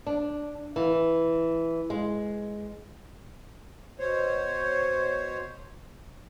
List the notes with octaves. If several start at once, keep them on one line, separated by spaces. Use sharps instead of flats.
D4
E3
G#3
B2 C5 C#5